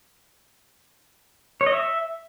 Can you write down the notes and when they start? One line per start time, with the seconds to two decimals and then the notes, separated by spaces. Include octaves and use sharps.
1.61 C#5
1.66 D#5
1.72 E5